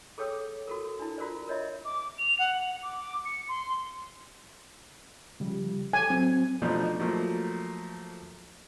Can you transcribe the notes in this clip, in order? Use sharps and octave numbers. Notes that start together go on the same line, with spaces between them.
G#4 A4 C#5 G5 D6 E6
F#4 A4 A#4
D4 E4
F4 F#4 A#4 C5 D5
A#4 C#5 D#5 E5
D6
F7
F#5
D6
D6
C#7
C6
C#3 F3 G3
A4 G#5
F#3 C4
B2 F3 A3 B3 D4 D#4
F3 F#3 A3 A#3